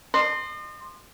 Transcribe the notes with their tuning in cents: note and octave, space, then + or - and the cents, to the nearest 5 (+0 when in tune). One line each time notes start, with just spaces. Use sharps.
D#5 -40 C6 +0